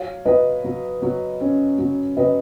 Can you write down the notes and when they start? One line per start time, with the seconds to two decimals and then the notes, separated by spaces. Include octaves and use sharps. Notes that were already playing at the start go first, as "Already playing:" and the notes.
Already playing: F#3 C#5 F5
0.25 F#3 B4 D#5
0.64 F#3
1.02 F#3
1.40 C#4
1.78 F#3
2.17 F#3 B4 D#5